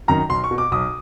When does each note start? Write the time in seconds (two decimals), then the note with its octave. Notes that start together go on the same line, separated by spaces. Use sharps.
0.08 F#2 D#3 A#5
0.29 B1 C6
0.44 C#6
0.51 B2
0.58 D6
0.72 B1 D#6